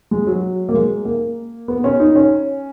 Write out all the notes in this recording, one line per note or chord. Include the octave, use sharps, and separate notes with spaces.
G#3
F#3
A#3
G#3
A#3
B3
C#4
D#4
C#4